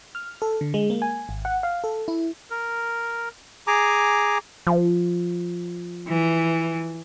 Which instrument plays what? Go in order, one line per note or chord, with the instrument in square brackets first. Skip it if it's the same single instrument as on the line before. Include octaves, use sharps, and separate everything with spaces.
[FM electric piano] F6
A4
D3
G#3
A#3
G#5
G#1
F#5
F5
A4
E4
[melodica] A#4
G#4 G#5 A#5 D6
[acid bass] F3
[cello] E3